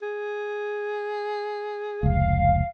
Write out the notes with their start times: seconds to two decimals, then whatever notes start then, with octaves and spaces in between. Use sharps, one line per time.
0.02 G#4
2.03 F1 C#2 F5